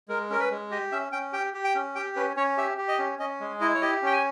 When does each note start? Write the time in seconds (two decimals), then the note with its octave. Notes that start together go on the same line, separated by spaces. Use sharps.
0.09 G#3 A#4
0.30 C#4 A#4
0.40 B4
0.51 G#3
0.71 G4 D#5
0.92 C#4 E5
1.12 C#4 G5
1.33 G4 G5
1.54 G4
1.64 G5
1.75 C#4
1.95 G4 G5
2.16 C#4 B4
2.37 C#4 C#5
2.57 G4 E5
2.78 G4
2.88 D#5
2.99 C#4
3.19 C#4 D#5
3.40 G#3
3.61 E4 D#5
3.74 C#5
3.81 G4 D#5
4.02 C#4 G5
4.13 G#5